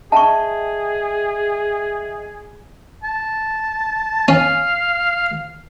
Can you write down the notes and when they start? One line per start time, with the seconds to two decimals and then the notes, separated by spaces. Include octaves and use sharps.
0.12 G#4 D#5 E5 G5 A5 C#6
3.03 A5
4.28 C#4 F5